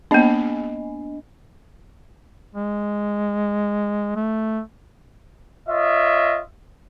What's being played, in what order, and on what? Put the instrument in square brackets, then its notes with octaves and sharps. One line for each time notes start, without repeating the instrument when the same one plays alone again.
[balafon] A#3 B3 [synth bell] D4 D#5 G#5
[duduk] G#3
A3
[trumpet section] F4 C#5 D#5 E5